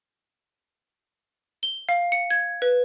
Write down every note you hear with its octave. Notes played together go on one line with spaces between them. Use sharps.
G7
F5
C#7
G#6
B4